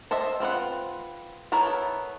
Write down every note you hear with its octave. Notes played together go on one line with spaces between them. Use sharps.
A4 C5 D#5 E5 A5
C4 F4 B4 F#5
B3 E4 A4 A#4 C#5